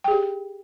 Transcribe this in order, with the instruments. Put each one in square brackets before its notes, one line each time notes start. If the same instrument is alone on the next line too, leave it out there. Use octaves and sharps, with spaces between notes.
[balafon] G5
G#4
G4